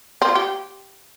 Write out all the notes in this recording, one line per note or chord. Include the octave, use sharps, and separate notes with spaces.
C4
F4
G4